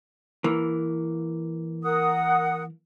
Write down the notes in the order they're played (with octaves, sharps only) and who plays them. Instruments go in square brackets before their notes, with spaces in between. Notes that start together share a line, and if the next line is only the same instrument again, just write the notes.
[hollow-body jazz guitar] E3 A#3
[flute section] A#4 F#5 D#6